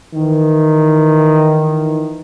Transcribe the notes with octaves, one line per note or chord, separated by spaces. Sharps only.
D#3 E3